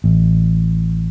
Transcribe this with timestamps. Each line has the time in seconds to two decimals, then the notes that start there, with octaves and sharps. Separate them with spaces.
0.04 A1